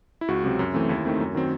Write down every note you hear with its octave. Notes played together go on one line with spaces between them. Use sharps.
E4
C#2 F#4
C3 F#3 C4
F#2
E3 A3 C4
D#2 E4
D#3 A3 C4
F#2
D#3 F#3 C4